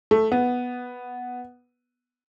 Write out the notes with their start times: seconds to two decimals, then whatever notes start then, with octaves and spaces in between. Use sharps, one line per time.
0.11 A3
0.32 B3